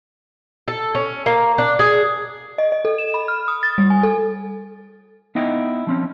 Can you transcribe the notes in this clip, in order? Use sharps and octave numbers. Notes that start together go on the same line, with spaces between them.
A4
C#4
A#3
D4
G#4
D#5
D#5
A4
E7
B5
F6
D#6
A6
G3
G#5
A4
B3 D#4 E4 D#5 G5
F3 C4 C#4